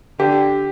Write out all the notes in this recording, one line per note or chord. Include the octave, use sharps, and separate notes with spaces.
D3 G4